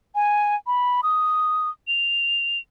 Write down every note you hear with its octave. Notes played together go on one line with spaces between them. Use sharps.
G#5
B5
D#6
F7